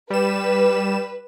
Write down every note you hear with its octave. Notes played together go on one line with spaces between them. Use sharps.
G3 B4 E7